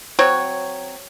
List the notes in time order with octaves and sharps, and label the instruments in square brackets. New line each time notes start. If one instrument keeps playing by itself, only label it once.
[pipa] F#3 C4 C#5